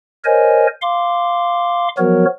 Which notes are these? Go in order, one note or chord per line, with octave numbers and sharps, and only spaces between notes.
A#4 C5 C#5 D#5 G#5
F5 C6 D6
F3 F#3 B3 F#4 A#4 C#5